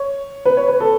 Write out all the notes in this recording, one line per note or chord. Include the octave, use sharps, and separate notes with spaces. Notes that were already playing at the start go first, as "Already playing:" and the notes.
Already playing: C#5
B4
C#5
B4
A4